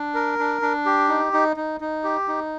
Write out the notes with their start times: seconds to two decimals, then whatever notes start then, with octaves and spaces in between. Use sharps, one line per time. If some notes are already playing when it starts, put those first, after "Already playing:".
Already playing: D4
0.14 A#4
0.39 D4
0.62 D4
0.85 G4
1.09 D#4
1.33 D#4
1.56 D#4
1.81 D#4
2.04 G4
2.28 D#4